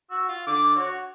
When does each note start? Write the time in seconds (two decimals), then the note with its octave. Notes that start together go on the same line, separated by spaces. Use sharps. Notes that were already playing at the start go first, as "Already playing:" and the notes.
0.11 F#4 E6
0.29 F4 F5
0.47 D3 D6
0.76 F#4 C#5